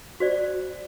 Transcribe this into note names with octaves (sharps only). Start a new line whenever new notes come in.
F#4 C5 D5